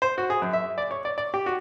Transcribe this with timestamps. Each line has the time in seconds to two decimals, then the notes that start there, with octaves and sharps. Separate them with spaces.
0.02 C5
0.18 F#4
0.30 G#4
0.42 F#2
0.53 E5
0.78 D5
0.91 C#5
1.05 D5
1.18 D5
1.34 G4
1.46 F#4